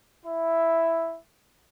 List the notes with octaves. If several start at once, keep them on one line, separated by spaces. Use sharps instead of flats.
E4 E5